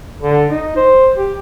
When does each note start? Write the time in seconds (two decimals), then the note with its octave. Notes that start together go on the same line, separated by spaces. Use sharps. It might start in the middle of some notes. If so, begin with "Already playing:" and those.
0.22 D3
0.50 D#4
0.76 C5
1.17 G4